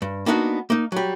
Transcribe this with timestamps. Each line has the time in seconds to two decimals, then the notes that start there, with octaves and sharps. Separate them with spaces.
0.02 G2
0.26 A#3 B3 D4 D#4 F4 F#4
0.70 A#3 D#4
0.92 F#3 G3